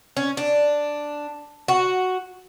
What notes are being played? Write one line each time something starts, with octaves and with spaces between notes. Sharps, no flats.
C#4
D4
F#4